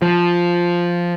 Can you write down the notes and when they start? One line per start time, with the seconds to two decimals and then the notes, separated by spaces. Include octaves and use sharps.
0.02 F3